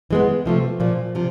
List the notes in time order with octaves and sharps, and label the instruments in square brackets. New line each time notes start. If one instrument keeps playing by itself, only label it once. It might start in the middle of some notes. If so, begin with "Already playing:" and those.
[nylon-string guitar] E3 G#3 B3
C3 F3 A3
A#2 F3 A#3
C3 F3